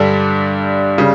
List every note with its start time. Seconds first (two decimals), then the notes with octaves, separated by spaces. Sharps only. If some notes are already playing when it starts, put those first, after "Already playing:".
Already playing: G2 D3 G3 D4 A4
0.98 C#3 G3